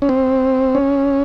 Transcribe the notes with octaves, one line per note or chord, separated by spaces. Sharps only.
C#4
C4
C#4